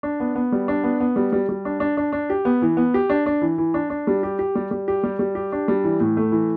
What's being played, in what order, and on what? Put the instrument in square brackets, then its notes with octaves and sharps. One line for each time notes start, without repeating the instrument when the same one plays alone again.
[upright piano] D4
B3
B3
G3
D4
B3
B3
G3
G3
G3
D4
D4
D4
D4
G4
B3
E3
B3
G4
D4
D4
E3
E3
D4
D4
G3
G4
G4
G3
G3
G4
G3
G3
G4
D4
G3
E3
A2
A3
E3